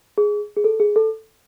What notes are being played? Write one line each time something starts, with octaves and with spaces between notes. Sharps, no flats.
G#4
G#4
A4
G#4
A4